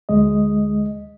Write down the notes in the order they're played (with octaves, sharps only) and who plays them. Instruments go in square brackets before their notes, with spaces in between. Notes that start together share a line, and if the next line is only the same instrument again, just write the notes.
[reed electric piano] D2 G#3 D#5